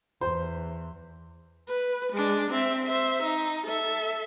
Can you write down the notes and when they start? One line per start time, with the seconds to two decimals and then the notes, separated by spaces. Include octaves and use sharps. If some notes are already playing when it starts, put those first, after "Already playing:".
0.21 E2 C5
1.69 B4
2.13 G#3 D4
2.51 C4 E5
2.86 C5 E5
3.23 D#4
3.67 A4 E5